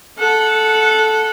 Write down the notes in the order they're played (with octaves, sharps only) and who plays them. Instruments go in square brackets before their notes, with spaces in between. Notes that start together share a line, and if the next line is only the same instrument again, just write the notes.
[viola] A4 F#5